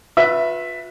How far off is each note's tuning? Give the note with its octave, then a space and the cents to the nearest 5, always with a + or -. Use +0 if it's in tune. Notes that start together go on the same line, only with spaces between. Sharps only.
F4 +40 B4 -5 E5 +0